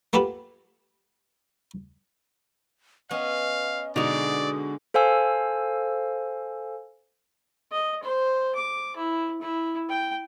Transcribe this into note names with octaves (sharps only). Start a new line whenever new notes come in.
A#3 B3 F4 G4 A4 B4
B3 C#4 D#5 F5
B2 D3 G#3 D#4 D5 D#6 F7
A4 C5 F5 G#5 E6
D#5
C5
D6
E4
E4
G5